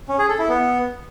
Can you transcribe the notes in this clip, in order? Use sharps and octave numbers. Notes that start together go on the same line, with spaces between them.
C#4
G#4
A4
E4
B3